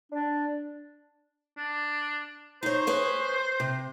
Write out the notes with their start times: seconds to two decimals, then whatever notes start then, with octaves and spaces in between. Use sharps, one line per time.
0.12 D4
1.57 D4
2.63 D#4 C5 C#5
2.87 G#4 B4 C#5
3.60 C3